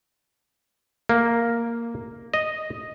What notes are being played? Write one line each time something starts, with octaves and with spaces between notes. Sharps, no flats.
A#3
D#5